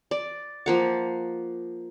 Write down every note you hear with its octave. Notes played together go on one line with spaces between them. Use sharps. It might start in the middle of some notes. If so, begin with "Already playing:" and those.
D5
F3 A#3 F#5